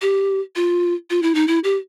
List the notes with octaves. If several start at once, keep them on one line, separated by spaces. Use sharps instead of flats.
G4
F4
F4
E4
D#4
E4
G4